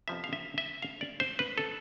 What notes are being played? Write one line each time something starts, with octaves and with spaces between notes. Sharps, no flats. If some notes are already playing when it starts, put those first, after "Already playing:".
F2 C3 F3 B3 E5
F5
E5
E5
F5
D5
C5
B4
A4